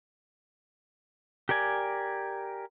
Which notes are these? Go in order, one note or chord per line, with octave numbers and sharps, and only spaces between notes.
G4 A#4 D5 G#5